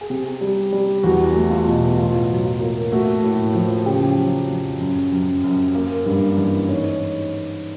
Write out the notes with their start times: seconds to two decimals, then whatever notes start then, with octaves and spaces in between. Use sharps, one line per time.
0.01 G#4
0.10 C3 G4
0.41 G3
0.72 G3
1.03 E2 F#4
1.36 A3
1.51 F4
1.67 B2
1.98 A2 F4
2.30 F#3
2.45 F4
2.61 A#3
2.92 A3 F#4
3.24 A2
3.55 F3
3.86 C#3 G4
4.18 F#3
4.49 F2
4.80 F#2
5.12 F#2
5.44 F#2
5.75 A#3
6.06 G2
6.37 E3
6.69 G#2 C#5